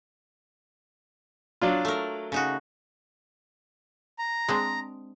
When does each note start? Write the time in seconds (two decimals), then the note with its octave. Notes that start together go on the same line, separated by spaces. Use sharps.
1.61 F#3 D4 F4
1.85 A3 A#4
2.32 C#3 D#4 F#4
4.19 A#5
4.48 G#3 C4 D4